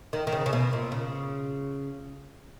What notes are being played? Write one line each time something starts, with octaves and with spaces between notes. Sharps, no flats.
D#3
D#3
C#3
C#3
B2
A#2
C#3